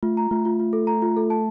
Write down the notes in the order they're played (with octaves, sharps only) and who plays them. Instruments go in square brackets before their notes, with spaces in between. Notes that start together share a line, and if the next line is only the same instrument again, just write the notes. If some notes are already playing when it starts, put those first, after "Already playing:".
[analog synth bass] A3 [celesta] F4
[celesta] A#5
[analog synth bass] A3 [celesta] F4
[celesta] F4
F4
A4
A#5
F4
A4
A5